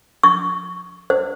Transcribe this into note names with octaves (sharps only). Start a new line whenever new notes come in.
C#6
C5